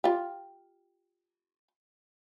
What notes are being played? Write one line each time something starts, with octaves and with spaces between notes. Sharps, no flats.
F4 G4